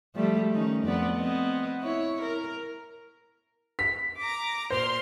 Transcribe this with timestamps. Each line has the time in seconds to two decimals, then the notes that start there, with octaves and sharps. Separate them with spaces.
0.15 F3 G3 A3
0.54 D#3 C#4 D#4
0.84 F2 B3 D5
1.17 B3 C4 D#5
1.82 E4 C#5
2.21 A#4
3.79 B6
4.18 A#5 D6
4.70 A#2 C5 C6 F6